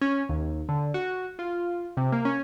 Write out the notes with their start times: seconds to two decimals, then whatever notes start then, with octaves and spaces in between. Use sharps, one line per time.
0.02 C#4
0.29 D#2
0.69 D3
0.94 F#4
1.39 F4
1.97 C3
2.12 A#3
2.25 C#4